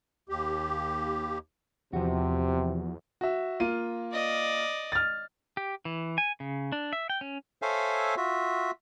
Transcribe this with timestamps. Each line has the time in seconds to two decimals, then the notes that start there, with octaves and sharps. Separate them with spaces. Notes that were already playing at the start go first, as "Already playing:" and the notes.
0.29 D#2 G4
1.93 E2 C3 F3 F#4
3.21 F#4 E5
3.60 A#3 F4 D#7
4.13 D5 D#5
4.92 F6 A6
5.57 G4
5.85 E3
6.18 G#5
6.40 C#3
6.72 D4
6.93 E5
7.10 G5
7.21 C#4
7.62 A4 C5 C#5 E5 F5 G#5
8.17 F4 F#4 E5